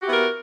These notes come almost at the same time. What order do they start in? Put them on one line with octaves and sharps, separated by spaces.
F#4 G4 E4 B3 A#4